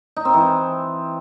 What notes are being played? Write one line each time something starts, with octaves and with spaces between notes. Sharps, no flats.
D#4
C4
E3